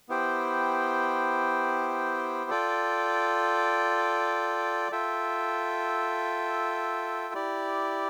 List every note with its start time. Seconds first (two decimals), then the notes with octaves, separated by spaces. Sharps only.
0.09 B3 E4 G4 C5 G5
2.50 F4 A4 D5 G5
4.92 F4 A4 E5 G5
7.34 E4 G4 D5